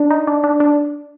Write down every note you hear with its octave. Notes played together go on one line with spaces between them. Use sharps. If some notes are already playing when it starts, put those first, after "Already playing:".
Already playing: D4
D#4
D4
D4
D4